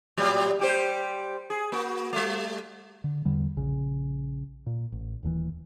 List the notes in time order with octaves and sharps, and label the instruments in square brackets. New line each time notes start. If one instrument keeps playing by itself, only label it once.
[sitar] A2 F#3 G3
G3 G4 C5
G#4
A#3 F#4
G3 A3
[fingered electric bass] D3
E2 D3 G3
A#1 C#3
A#2
A1
D#1 D#2 D3 E3